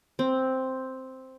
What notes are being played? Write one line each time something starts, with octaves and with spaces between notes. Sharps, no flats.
C4